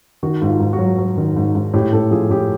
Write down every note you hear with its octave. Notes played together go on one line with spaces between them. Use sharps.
D#3 F#4
G#2
F4
G#2
F#4
F#3
F#3
D#3
G#2
G#2
A2 G4
A2 A4
F3 G#4
A2 G4